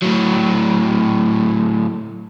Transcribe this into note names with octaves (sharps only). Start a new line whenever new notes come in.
A2 F#3